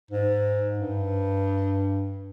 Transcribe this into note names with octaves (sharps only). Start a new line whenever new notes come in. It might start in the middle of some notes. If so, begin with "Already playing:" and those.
G#2
G2